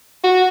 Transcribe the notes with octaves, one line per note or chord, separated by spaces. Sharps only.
F#4